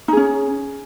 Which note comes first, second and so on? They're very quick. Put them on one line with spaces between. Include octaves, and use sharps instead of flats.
D#4 G#4 C#4